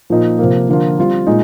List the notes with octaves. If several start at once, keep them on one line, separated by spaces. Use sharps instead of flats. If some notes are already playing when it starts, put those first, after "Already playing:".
A#2 F3 A#3 D#4
C3 F3 A#3
D3 F3 A#3 F4
G3 C4 F4
A#2 G#3 D#4